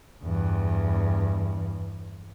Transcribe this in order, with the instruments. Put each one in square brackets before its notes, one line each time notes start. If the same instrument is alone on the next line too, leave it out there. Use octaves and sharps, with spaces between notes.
[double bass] E2 G2